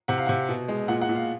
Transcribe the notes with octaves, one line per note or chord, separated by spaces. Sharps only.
C3 F#5
F5
C3 F#5
B2
G#3
A#2 F#5
F#5
A#2
F5